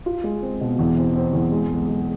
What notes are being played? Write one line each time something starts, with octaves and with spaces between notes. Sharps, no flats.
F4
G#3
C4
B2
E2
C4
C4
E2
G#3
B1
G#3